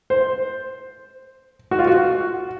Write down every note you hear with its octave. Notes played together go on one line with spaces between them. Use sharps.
C5
F#4
F4
F#4